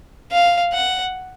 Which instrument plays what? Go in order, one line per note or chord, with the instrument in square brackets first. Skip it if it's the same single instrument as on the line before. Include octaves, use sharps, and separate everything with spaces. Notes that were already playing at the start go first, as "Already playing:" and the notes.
[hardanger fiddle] F5
F#5